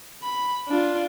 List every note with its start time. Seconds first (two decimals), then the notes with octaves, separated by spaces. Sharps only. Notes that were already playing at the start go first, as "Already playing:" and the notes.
0.23 B5
0.69 D4 F4